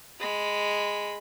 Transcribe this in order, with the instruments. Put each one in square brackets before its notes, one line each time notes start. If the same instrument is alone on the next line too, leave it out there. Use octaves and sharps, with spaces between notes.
[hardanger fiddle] G#3 B5